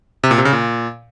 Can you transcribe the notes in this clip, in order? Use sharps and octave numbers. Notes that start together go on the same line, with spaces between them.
C3
A#2
C3
C#3
A#2